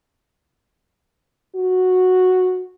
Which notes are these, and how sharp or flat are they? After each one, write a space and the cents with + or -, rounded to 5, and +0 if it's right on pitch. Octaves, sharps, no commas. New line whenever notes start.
F#4 -5